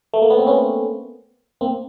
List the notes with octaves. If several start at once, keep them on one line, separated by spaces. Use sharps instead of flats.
A3
A#3
B3
C4
B3 C#4
A#3 C4